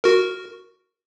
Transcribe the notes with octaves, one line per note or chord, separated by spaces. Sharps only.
F#4 A#4